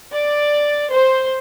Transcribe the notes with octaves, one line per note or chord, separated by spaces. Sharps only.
D5
C5